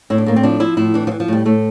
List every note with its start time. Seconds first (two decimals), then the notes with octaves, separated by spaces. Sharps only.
0.10 A2 E4
0.18 D4
0.26 A2 A#3
0.36 C4
0.43 F3 D4
0.60 F3 E4
0.77 A2 E4
0.94 E3 D4
1.07 F3
1.11 E3
1.20 F3
1.28 A2 G3
1.45 A2 A3